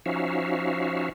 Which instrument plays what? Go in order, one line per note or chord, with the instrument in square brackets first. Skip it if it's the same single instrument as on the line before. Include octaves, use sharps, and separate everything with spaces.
[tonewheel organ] F3 C#4 D#4 F#4 E5 F5